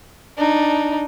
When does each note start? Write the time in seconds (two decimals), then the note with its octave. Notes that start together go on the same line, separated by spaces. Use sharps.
0.38 D4 D#4